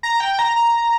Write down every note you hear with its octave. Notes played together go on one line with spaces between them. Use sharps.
A#5
G5
A#5
A#5